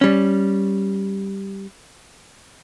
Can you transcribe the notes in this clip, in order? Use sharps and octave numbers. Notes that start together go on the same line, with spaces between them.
G3 C#4